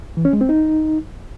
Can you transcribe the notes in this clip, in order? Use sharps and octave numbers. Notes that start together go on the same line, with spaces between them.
E3
C#4
G#3
C4
D#4